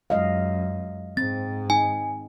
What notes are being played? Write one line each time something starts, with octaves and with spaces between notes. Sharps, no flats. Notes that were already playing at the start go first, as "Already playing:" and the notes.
F#2 G#3 D#5 F5
G#2 C4 A6
D#4 G#5